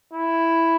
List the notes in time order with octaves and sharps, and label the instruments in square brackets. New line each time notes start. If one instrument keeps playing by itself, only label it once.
[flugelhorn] E4